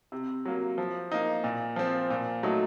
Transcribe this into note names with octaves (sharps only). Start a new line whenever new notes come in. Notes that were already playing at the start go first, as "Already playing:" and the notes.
C3
F#3 A#3
F3
A#3 D#4
A#2
F3 C4
A#2
F#3 A3 D#4